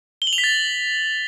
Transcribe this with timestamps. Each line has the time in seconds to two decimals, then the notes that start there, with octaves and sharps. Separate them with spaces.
0.22 G7
0.27 F#7
0.33 F7
0.38 B6
0.44 A6